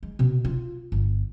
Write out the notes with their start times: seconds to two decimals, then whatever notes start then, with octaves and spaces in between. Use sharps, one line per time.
0.03 G#3
0.19 B2
0.45 F4
0.92 G1